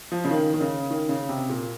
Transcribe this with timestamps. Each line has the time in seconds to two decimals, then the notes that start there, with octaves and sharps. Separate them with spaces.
0.12 F3
0.25 C#3
0.31 D#3
0.54 D#3
0.61 C#3
0.90 D#3
1.09 C#3
1.29 C3
1.49 A#2